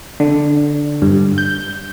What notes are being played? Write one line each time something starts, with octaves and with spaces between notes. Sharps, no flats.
D3
G2
G6